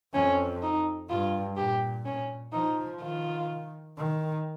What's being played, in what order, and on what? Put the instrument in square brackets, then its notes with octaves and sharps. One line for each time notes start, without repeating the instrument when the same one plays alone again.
[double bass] F2 [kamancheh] C#4
[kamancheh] D#4
[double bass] G2 [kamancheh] F4
[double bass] A#2 [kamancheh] G4
[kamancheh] C#4
[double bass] F3 [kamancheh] D#4
[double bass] D#3 [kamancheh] F4
[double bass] D#3